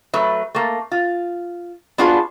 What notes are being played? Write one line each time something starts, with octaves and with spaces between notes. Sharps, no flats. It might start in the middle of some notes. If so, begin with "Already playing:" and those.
F#3 A3 B4
A3 A#3
F4
B3 D4 F4 F#4 G#4 B4